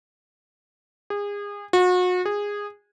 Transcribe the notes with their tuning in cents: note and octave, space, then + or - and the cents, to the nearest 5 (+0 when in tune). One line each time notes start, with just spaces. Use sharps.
G#4 -30
F#4 -35
G#4 -15